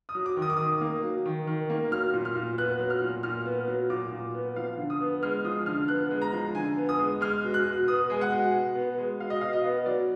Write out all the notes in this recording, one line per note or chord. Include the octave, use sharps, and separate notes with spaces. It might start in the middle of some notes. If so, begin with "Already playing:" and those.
D#6
F#3
D6
D#3
D#6
D6
D#3 D#6
A#3
F#3
D#3
D#3
A#3
F#3 F6
A#2
F6
A#2
B3 F#6
F#3
F6
A#2
A#2 F6
B3
F#3
A#2 D6
A#2
B3
F3 F5
D3
D#6
B3
G#3 F6
F3 D#6
D3 F6
B3 F#6
G#3
A#5
F3
D3 G#5
B3
D#6
G#3
G#3 F6
B2
F#6
B2
B3 D#6
G#3 G#5
F#5
B2
B2
B3
G#3
B2 F5
D#5
B2 F5
D#5
B3
F#3 D5